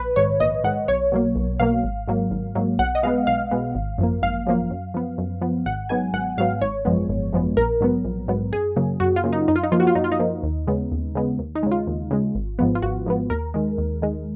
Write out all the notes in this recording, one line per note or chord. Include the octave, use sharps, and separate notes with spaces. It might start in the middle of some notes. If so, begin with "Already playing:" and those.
Already playing: A#1 B4
G#2 D#3 C#5
A#1 D#5
G#2 D#3 F#5
B1 C#5
B2 F#3 A#3
B1
B2 F#3 A#3 F5
G#1
G#2 F#3 A#3
G#1
G#2 F#3 A#3
B1 F#5
D#5
B2 G#3 B3 F5
B1 F5
B2 G#3 B3
G#1
F#2 F3 A#3
G#1 F5
F#2 F3 A#3
F#2
F3 B3
F#2
F3 B3
G#1 F#5
G#2 F#3 B3 G#5
G#1 F#5
G#2 F#3 B3 F5
G#1 C#5
F#2 F3 G#3 B3
G#1
F#2 F3 G#3 B3
A#1 A#4
G#2 F#3 B3
A#1
G#2 F#3 B3
F#2 G#4
C#3 F#3 A#3
F#2 F#4
F4
C#3 F#3 A#3
D#4
F#2 D#4
F4
D#4
F3 A#3 F4
F#4
F4
F#2 D#4
F4
D#4
F3 A#3
D#2
C#3 G#3 B3
D#2
C#3 G#3 B3
D#2
D#4
C#3 G#3
F4
D#2
C#3 G#3
G#1
G#2 F3 B3
F4
G#1 F#4
G#2 F3 B3
D#2 A#4
D#3 G#3
D#2
D#3 G#3